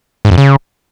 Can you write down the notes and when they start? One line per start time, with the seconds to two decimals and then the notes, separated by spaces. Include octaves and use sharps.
0.25 G#2
0.31 F2
0.38 C#3